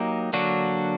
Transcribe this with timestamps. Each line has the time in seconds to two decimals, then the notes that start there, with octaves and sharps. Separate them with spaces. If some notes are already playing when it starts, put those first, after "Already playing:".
Already playing: F#3 A#3 D#4 G4
0.33 D3 F#3 A#3 D4 F#4